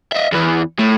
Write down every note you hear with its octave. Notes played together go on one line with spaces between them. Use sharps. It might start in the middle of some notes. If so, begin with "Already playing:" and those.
D#5 E5
E2 E3
A2